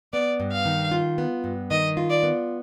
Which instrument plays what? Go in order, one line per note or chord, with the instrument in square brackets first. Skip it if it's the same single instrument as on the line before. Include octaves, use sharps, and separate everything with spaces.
[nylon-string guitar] B3 [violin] D5
[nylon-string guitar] G2
[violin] F5
[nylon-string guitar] D#3
F4
B3
G2
[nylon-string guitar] D#3 [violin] D#5
[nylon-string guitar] F4
[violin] D5
[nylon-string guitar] B3